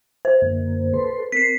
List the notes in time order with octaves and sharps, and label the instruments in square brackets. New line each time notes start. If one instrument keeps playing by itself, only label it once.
[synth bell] C5
[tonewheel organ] F#2 D3 A#3
A4 B4 C6
[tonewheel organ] C4 A#4 [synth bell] B6 C7